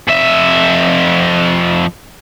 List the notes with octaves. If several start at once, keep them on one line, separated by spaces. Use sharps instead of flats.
F2 E5